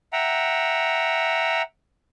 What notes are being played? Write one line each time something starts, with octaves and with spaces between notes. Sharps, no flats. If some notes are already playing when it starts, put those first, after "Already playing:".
E5 F#5 G5 A#5